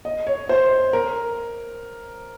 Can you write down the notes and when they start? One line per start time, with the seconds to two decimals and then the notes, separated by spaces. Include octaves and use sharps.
0.05 D#5
0.27 C#5
0.49 C5
0.93 A#4